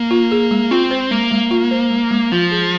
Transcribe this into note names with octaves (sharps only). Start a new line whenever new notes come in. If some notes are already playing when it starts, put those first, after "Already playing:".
Already playing: A#3
F4
G#4
G#3
C4 F4
C5
G#3 A#3
G#3
F4
C5
G#3
G#3
F3 F4
G#4